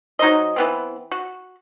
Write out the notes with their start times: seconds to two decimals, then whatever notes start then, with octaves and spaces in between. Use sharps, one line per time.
0.19 F#3 D#4 C5 D#5
0.56 E3 B3 C4
1.12 F#4